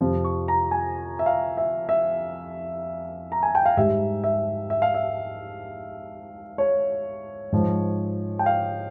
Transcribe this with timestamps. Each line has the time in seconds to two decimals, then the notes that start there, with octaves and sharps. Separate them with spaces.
0.01 F2 C3 F3
0.24 C#6
0.48 A#5
0.71 G#5
1.19 E5
1.26 F5
1.57 E5
1.89 E5
3.32 A#5
3.43 G#5
3.55 G5
3.66 F5
3.77 G#2 G3 E5
4.24 E5
4.70 E5
4.82 F5
4.94 E5
6.58 C#5
7.52 G#2 F3
8.39 G5
8.46 F5